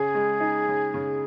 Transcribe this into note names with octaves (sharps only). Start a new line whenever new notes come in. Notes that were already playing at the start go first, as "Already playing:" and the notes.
Already playing: C#3 G#4
G#3
D#4
C#3
C#3